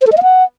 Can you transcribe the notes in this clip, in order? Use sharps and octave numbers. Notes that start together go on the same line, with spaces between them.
C5
A4
D#5
F5
F#5